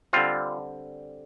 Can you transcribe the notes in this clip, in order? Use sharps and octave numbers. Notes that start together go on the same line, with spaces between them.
D3 G3 C4 F4